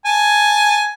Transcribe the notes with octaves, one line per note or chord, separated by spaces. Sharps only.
G#5 A5